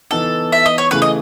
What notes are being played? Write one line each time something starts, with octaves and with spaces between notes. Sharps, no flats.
E3 B3 D#4 A4
E5
D#5
C#5
C#3 E3 A3 E4 G#4 B4
D#5